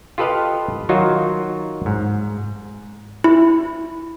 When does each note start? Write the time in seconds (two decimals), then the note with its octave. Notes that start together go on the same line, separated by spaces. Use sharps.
0.18 F4 G4 A4 B4 D#5 F5
0.89 D#3 F#3 D#4 F4 F#4
1.86 G#2
3.24 E4